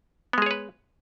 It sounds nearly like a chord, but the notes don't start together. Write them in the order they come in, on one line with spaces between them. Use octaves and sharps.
B3 G#3 G#4 C#5 B4